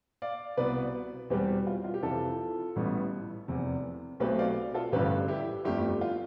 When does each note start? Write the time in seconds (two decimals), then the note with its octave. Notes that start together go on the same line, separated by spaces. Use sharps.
0.22 D5 F5
0.57 C2 B2 B3 B4 D5
1.30 E2 B2 G3 C4 G4 B4
1.67 F4
1.84 F4
1.94 G4
2.03 F2 C3 E3 F4 A4
2.76 A1 A2 G3 B3
3.48 F1 E2 C3
4.20 B1 B2 A3 C4 G4 B4
4.39 D5 F5
4.74 F4 A4
4.92 A1 G2 D3 G4 B4
5.28 E4 G4
5.65 G1 F2 D3 A3 E4 G4
6.01 F4